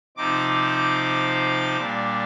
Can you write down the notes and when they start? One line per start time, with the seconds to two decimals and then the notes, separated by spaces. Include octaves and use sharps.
0.17 C3 F3 C4 D#4 D6
1.76 A#2 G3 D4